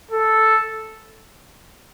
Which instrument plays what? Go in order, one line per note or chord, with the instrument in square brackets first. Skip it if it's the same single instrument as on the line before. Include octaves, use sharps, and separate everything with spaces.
[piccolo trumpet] A4